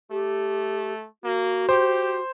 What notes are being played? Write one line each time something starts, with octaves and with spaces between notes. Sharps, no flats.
A3 G4
A#3 F#4
G4 C5